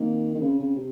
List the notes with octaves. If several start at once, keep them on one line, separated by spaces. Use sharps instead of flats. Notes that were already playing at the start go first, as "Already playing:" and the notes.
Already playing: D#3 A#3 C4
D#3
C#3 C4
C#3
C3